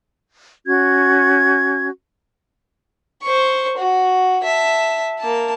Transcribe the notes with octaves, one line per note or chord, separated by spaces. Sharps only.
C#4 F#4 G#6
C5 C#6
F#4
E5 A5
A#3 A5